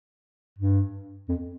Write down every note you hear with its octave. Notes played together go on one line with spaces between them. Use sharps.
G2
F2